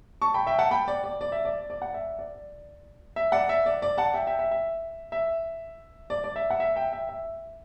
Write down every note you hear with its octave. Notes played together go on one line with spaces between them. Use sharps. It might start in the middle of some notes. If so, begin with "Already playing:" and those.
A5 C#6
G5 B5
E5 G5
F#5 A5
G5 B5
D5
D5
D5
E5
D5
D5
F#5
E5
D5
E5
D5 F#5
E5
D5
D5
F#5 A5
E5 G5
E5 G5
E5
E5
E5
D5
D5
E5
F#5
E5
E5 G5
E5
E5